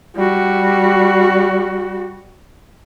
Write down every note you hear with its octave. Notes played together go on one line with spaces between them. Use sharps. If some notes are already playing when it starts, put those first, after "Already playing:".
G3 F#4